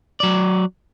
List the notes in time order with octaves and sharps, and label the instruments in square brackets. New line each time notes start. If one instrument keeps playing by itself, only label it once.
[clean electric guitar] F#3 D5